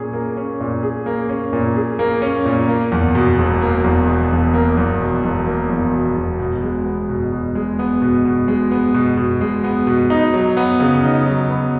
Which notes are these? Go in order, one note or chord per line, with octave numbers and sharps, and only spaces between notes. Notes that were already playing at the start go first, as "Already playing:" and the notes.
Already playing: A#2 A#3 C#4 G#4
A#3
C#4
A#2
G#4
A#3
C#4
A#2
G#4
A#3
C#4
A#2
A#3
E2
B2
E1
A#3
E2
B2
E1
A#3
E2
B2
E1
A#3
E2
B2
E1
B2
G#3
B3
B2
B2
G#3
B3
B2
B2
G#3
B3
B2
B2
G#3
B3
B2
D#4
F#3
B3
C#3
D#4
F#3
B3